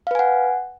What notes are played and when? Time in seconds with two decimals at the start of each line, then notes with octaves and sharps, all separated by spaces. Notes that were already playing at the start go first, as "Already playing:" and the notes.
0.07 F5
0.11 B4
0.15 G#5
0.19 F#5